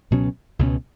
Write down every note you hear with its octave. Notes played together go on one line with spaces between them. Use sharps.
C#2 B2 F#3 C#4
C#2 B2 F#3 C#4